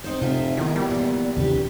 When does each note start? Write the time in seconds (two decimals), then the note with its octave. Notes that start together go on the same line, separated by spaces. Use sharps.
0.04 C4 D#4 C5
0.22 F1 C3 F4 C5 E5
0.57 E2 D#3 G#4 A#4
0.76 E3 G3 F4
0.90 A#2 B3
1.37 A#1 D#2 C3 E3 G4 B4